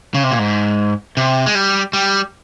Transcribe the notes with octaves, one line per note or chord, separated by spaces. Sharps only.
C#3
C3
A#2
G#2
C3
G#3
G3
G3